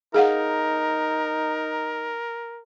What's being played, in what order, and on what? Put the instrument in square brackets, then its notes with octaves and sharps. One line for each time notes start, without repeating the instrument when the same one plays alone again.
[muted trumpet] D#4 [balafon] G#4 F5 F#5 [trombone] A#4